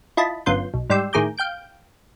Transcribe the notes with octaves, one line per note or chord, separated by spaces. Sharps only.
E4 F4 D#5 A5 B5
G1 F#2 B3 F4 C6 G6
B1
G#2 G3 D5 G5 C6 E6
A2 D#3 G#4 A#5 D6 G6
F5 G5 G6 D7